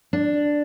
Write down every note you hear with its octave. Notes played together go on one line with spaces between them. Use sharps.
D4